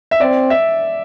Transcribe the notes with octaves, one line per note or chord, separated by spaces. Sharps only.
E5
C4 D5
E5